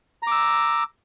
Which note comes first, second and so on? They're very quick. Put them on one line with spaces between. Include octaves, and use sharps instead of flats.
A#5 D6 E6